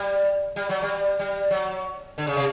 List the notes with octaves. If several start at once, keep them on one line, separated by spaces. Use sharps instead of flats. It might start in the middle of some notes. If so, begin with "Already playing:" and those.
Already playing: G3
G3
F#3
G3
G3
F#3
D3
C#3
C3